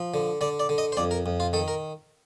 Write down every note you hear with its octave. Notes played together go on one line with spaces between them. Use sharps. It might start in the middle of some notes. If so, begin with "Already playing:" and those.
Already playing: F3
D3
D3 D5
D5
D3
D#5
C5
F2 D5
A#4
F2
F4
D#3 A4
A#4